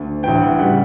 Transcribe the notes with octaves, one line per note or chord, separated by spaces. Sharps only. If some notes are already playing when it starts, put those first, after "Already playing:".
Already playing: D2
A1 G2 E3 G5
F#5
C#3 G3 F#5